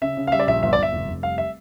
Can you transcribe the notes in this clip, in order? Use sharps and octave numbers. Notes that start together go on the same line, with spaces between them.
C#3 E5
C#3
F5
G3 E5
D5
A#1 E5
G1 E5
D5
G1 E5
F1
F1
G3 F5
E5